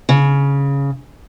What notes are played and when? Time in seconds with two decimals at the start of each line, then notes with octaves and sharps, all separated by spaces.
0.09 C#3